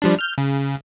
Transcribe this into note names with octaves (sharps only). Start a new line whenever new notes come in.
F3 G3 D4
F6 G6
C#3